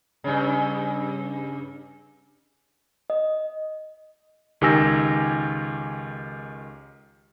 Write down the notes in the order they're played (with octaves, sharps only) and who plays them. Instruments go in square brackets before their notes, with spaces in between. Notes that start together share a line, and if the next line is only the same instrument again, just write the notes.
[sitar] G2 C#3
[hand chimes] D#5
[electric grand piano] C#2 D#3 G4 G#5 E6 A#6